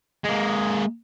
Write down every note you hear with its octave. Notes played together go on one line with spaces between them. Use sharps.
G#3 A#3